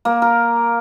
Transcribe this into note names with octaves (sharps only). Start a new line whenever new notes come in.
A#3
A#4